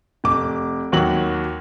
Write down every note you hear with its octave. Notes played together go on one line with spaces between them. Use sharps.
F1 D6
D#2 F#3 F#7